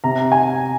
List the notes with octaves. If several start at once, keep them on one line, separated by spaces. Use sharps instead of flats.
C3 A#5
G#5